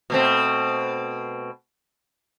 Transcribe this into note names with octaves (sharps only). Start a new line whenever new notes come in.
B2 A3 C4